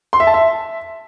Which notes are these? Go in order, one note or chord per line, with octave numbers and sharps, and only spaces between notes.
C6
E5
A5
E5